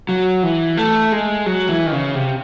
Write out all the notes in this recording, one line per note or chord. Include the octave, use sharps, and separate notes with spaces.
F#3
E3
A3
G#3
F#3
E3
D#3
C#3
C3